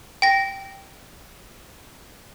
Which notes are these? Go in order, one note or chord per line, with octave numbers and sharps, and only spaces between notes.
G5 A#6